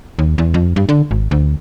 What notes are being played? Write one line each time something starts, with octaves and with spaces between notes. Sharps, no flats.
D#2
E2
F2
G2
D3
G#1
D2